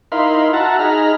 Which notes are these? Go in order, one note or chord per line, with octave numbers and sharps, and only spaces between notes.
D#4 E4 A#4 F5 B5 C6
F#4 E5 F#5 A5 A#5
D#4 G#4 A#5 B5 F6